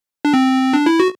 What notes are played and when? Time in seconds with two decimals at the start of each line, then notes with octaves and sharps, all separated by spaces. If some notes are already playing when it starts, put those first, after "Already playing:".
0.25 D4
0.34 C4
0.73 D4
0.86 E4
1.00 F#4